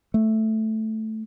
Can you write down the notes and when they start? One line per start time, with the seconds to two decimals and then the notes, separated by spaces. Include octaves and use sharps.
0.14 A3